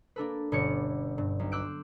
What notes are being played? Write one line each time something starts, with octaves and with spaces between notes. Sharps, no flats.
A#3 D4 A4 B4
G1 B2 C#4 C#5 D5 C#7
G2
B1
C6 D6 E6 F#6 G6 D7